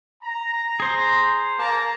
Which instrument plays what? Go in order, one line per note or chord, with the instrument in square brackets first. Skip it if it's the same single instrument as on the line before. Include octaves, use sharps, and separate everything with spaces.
[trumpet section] A#5
[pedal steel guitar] G#4 C5
[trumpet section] A#3 A5 A#5